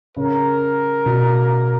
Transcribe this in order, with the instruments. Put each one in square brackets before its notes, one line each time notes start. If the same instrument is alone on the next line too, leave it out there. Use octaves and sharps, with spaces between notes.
[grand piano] C#3 [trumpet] A#4
[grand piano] B2